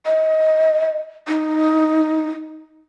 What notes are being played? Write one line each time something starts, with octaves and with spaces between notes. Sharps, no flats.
D#5
D#4